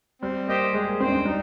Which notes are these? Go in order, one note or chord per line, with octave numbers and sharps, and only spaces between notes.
G3 C4
A#3 G4 C5 D#5 G5
G#3 G#4
A#3
C4 D4 C5 G5
C4
G3 D#4